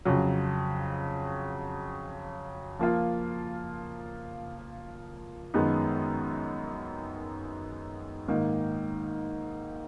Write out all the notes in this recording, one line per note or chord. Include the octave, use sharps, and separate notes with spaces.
F2 C#3 F#3
F3 A#3 F4
F#2 D#3 G#3 B3 D#4
G#2 D#3 A#3 D#4